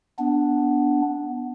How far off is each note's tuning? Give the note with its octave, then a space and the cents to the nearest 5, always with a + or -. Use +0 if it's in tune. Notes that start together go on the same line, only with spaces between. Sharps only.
B3 +0 D4 -5